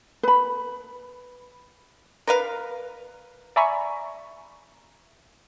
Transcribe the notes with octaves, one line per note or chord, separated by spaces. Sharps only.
B4 B5
A#4 B4 F5
D5 E5 G#5 A#5 B5 C#6